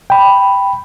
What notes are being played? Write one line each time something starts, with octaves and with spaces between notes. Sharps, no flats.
G5 B5